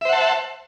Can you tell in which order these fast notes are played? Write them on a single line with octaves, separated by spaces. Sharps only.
E5 C5 F#5 A5